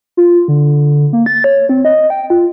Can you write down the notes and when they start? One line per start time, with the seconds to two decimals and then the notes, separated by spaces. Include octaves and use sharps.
0.17 F4
0.48 D3
1.13 A#3
1.26 A6
1.44 C#5
1.69 C4
1.85 D#5
2.10 G5
2.30 F4